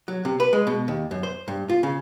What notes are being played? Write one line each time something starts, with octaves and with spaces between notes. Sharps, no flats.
F#3
C3
B4
G#3
B2
D#2
F#2
C5
G2
F4
C#3